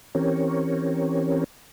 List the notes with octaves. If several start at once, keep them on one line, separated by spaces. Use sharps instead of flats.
E3 C4 C#4 G4 A#4 C#5